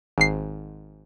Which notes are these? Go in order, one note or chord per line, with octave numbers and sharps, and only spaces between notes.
G#1 C7